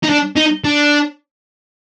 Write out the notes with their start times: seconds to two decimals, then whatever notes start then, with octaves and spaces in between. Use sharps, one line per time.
0.04 D#4
0.09 D4
0.36 D#4
0.65 D4